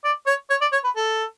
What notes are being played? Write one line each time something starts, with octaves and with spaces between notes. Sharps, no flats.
D5
C#5
C#5
D5
C#5
B4
A4